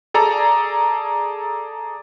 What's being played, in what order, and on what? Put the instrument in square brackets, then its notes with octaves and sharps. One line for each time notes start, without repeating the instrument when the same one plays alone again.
[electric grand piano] G#4 A4 D5 A#5